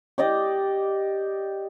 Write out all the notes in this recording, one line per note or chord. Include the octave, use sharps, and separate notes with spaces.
G4 D5 D#5 G5